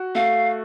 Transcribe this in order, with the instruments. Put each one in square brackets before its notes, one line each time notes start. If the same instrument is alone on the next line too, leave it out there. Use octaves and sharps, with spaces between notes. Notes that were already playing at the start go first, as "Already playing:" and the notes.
Already playing: [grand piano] F#4
[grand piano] A3 [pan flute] F5